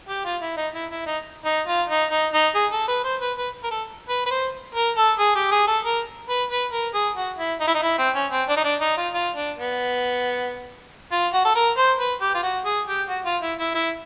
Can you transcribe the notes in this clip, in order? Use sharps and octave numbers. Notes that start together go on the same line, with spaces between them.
G4
F4
E4
D#4
E4
E4
D#4
D#4
F4
D#4
D#4
D#4
G#4
A4
B4
C5
B4
B4
A#4
A4
B4
B4
C5
A#4
A4
G#4
G4
G#4
A4
A#4
B4
B4
A#4
G#4
F#4
E4
D#4
E4
D#4
E4
C4
C#4
C4
D4
D#4
D4
D#4
F4
F4
D4
B3
F4
F#4
A4
A#4
C5
B4
G4
F4
F#4
G#4
G4
F#4
F4
E4
E4
E4